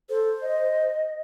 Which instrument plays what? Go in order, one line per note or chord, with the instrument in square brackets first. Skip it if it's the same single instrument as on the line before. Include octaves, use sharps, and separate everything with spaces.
[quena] A4 [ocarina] C5
[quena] D#5